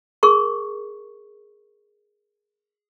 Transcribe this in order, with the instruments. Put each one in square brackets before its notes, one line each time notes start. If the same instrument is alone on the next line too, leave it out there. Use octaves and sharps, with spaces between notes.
[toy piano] G#4 A#4 C#6